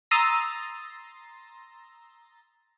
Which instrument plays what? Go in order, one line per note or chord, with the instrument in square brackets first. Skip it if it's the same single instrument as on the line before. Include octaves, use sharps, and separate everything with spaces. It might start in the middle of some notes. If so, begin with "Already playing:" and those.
[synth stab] A#5 C6 D#6 E6 A6 A#6